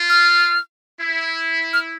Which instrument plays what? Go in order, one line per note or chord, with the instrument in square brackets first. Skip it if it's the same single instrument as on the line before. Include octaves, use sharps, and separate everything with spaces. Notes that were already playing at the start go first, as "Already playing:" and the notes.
Already playing: [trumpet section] F4
[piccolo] F6
[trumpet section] E4
[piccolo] F6